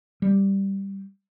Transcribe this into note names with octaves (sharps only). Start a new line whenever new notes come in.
G3